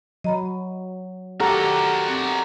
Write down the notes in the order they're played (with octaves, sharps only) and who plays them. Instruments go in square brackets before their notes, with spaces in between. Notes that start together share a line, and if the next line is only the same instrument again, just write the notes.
[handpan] F#3 [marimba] D#5 A#5 B5
[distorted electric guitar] F#4 D5 [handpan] G4 A4 F#5 [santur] A#4
[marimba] C4